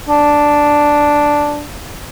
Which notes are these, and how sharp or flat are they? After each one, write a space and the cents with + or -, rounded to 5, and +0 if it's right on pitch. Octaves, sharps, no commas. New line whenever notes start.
D4 +0